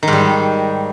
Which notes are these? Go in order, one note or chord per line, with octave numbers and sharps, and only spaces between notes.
G#2 D#3 G3